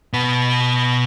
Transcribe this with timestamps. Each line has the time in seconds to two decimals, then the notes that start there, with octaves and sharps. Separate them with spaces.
0.13 B2 B4